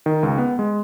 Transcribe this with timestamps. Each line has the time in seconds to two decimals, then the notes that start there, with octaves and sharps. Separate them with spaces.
0.06 D#3
0.23 C#2
0.38 B3
0.59 G#3